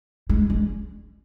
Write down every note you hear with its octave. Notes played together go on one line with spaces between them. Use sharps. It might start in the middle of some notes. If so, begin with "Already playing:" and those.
G#3
G#3